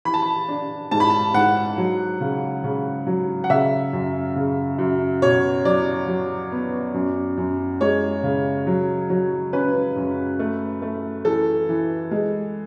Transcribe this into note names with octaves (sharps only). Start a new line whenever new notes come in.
E3 B5
A5
B5
D4
G#2 A5
B5
A5
G#2 F#5
F#3
C#3
C#3
F#3
F#5
C#3 E5
F#2
C#3
F#2
B2 C#5
F#3 D5
F#3
B3
F#2
F#2
G#3 C#5
C#3
F#3
F#3
C#4 B4
F#2
A3
A3
E3 A4
E3
G#3